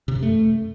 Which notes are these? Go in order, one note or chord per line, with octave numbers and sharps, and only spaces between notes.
C3
F#2
A3